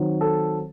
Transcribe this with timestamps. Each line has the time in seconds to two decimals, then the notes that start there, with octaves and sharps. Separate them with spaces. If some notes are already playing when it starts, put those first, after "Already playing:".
Already playing: D#3 F#3 C4
0.21 A4